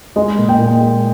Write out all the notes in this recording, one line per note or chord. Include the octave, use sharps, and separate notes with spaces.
G#3 D#5
A#2
G5
A#2
G#3